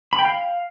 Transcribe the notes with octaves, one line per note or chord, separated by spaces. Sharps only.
B5
G5
F5